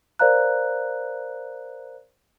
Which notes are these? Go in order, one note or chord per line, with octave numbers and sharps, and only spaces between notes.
A#4 C5 D5 F5 A#5 F#6